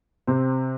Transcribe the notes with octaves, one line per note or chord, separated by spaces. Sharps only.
C3 C4